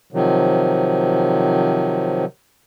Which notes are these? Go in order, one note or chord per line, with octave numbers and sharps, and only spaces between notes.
C3 D#3 F3 F#3